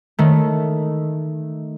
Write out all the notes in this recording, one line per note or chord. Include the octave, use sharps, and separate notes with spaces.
D#3 A3